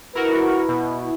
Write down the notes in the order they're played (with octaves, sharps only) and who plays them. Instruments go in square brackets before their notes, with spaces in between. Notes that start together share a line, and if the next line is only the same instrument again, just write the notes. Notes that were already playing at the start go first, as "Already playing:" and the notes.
[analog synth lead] E4 [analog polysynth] F#4 A#4 [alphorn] B4
[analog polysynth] B2